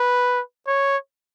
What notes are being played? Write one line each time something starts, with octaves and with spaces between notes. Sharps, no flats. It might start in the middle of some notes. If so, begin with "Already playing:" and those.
Already playing: B4
C#5